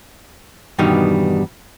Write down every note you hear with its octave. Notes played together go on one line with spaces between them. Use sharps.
E2 G2 B2 D#3 G3 D#4